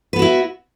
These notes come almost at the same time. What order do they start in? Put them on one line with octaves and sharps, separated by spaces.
B4 B3 F#4 E4